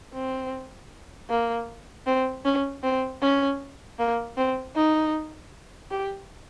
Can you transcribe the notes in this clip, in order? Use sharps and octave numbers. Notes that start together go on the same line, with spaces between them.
C4
A#3
C4
C#4
C4
C#4
A#3
C4
D#4
G4